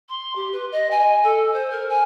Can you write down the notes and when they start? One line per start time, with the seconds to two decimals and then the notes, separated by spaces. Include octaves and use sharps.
0.09 C6
0.35 G4
0.52 B4
0.71 D#5
0.90 G#5
1.23 A4
1.53 C5
1.70 A#4
1.89 G#5